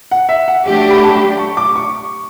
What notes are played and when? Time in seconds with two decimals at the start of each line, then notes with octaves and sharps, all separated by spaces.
0.11 F#5
0.29 E5
0.48 F#5
0.65 F#3 A3 D4 G4
0.91 B5
1.03 A5
1.39 C#6
1.57 D6
1.76 C#6